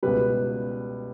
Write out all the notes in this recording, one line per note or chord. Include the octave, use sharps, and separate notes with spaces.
C#2 B2 G3 B4